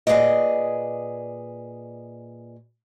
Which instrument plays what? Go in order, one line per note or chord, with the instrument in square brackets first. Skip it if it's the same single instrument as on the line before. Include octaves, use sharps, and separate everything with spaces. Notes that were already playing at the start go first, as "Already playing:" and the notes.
[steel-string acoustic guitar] A#2 G#4 B4 D5 D#5